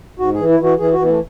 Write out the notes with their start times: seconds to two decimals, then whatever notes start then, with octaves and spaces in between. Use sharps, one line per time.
0.19 G#2 F#4
0.34 E3 G#4
0.48 E4
0.59 E3 F#4
0.79 E3 G#4
0.93 F#4
0.98 E3 B3
1.09 A3